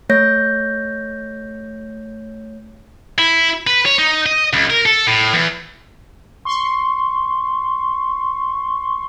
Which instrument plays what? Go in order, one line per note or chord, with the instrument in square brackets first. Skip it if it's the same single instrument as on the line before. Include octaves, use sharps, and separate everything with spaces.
[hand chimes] A3 C#5 G6 A#6
[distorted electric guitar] E4
B4
C#5
D#4
D#5
C#2
A#4
A4
A2
E2
[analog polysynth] C6 C#6